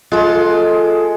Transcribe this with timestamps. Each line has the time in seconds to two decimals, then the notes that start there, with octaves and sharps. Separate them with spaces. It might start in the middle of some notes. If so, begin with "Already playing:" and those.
0.12 G#3 F4 A4